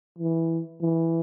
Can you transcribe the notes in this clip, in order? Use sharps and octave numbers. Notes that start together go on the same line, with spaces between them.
E3
E3